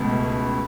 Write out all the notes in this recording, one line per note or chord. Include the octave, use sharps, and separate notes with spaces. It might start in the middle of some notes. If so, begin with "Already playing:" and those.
Already playing: C#2 B2 A3